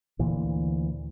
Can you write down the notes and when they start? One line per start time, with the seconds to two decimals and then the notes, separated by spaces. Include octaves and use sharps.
0.19 D2 A#2 E3